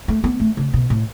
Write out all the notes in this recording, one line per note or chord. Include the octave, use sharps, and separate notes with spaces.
A3
B3
A3
C#3
B2
A2